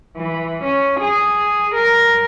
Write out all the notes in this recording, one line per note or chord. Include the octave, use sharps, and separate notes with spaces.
E3
C#4
G#4
A#4